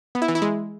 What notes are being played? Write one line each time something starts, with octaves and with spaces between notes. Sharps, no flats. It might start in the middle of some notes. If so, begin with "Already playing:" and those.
B3
E4
E3
E4
G#3